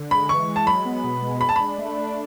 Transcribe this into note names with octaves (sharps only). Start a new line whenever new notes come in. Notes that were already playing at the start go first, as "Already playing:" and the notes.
Already playing: D3
G#3 B5
E3 C#6
G#3
A5
F#3 B5
B3
B2
G#3
G#3 B5
A5
D4 B5
A3
D4